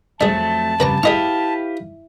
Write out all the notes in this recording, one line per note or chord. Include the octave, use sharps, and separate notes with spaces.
F2 F#3 A3 D4 G#4 A5
C#3 G3 B4 A#5 C#6
E4 G4 G#4 B4 D#5 F5 C#6